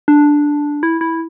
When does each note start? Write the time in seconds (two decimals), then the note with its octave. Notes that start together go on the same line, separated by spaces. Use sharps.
0.08 D4
0.83 E4
1.01 E4